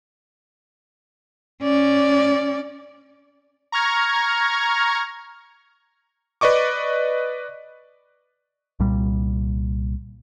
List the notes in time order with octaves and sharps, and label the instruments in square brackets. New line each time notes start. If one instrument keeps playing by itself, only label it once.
[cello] C#4 D5
[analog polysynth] A#5 C#6 F6 G#6
[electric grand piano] B4 D5 D#5 C#6 D6
[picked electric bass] C2 A#2 G3